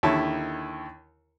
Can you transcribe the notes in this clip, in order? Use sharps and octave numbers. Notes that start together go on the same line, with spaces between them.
D#2 D3 D#3 E4 C#5 A5